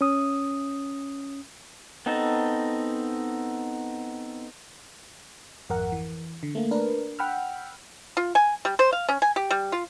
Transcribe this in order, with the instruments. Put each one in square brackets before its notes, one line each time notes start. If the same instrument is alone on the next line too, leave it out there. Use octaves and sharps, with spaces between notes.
[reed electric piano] C#4 D#6
[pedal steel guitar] B3 C4 D#4 A4
[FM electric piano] G#1 F2 A#4 F#5
E3
D3
A3 A#3
D4 A#4 B4
F#5 G5 B5 E6 F6
[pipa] F4
G#5
G3
C5
F5
C#4
G#5
G4
G3
F4